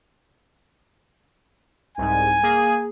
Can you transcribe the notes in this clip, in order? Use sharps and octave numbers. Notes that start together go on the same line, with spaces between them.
C2 G#2 G#5
A#3 G#4